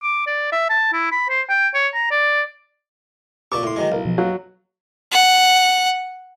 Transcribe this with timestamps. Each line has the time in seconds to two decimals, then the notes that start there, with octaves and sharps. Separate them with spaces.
0.03 D6
0.26 D5
0.52 E5
0.70 A5
0.93 E4
1.12 B5
1.29 C5
1.49 G5
1.74 C#5
1.94 A#5
2.11 D5
3.52 A#2 A5 C#6 D6
3.63 A2 C6
3.76 D#3 F#3 G#3
3.92 B1 E4 A#4 F5
4.05 B2 F3
4.18 F#3 F#4 F5
5.12 F#5